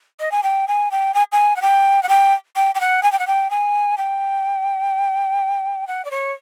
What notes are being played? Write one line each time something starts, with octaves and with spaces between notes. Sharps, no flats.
D#5
G#5
G5
G#5
G5
G#5
G#5
F#5
G5
F#5
G5
G5
G5
F#5
G#5
G5
F#5
G5
G#5
G5
F#5
D5
C#5